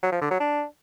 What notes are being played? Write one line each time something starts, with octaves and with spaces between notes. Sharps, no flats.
F#3
F3
D3
F#3
D4